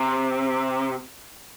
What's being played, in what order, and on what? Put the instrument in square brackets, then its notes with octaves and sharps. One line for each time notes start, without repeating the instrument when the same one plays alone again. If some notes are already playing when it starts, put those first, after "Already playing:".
Already playing: [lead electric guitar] C3